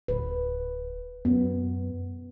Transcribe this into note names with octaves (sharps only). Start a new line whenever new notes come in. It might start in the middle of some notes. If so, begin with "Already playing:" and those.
D1 B4
F#2 B3